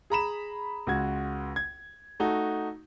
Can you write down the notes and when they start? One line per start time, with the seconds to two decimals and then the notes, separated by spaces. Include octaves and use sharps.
0.10 G#4 A#5 B5 E7
0.87 C#2 F#4 G#6
1.56 G#6
2.20 A3 D#4 F#4